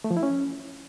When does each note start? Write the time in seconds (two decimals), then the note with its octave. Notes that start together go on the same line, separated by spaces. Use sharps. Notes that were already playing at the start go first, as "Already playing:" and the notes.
0.04 A3
0.11 F3
0.17 E4
0.23 C#4